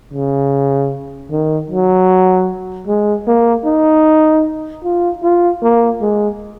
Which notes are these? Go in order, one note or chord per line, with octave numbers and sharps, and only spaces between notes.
C#3
D#3
F#3
G#3
A#3
D#4
F4
F4
A#3
G#3